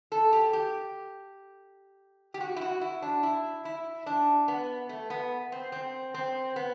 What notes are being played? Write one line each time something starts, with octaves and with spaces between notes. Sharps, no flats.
A4
G4
G4
G4
F#4
E4
F#4
E4
D4
E4
E4
D4
B3
A3
B3
C4
C4
C4
B3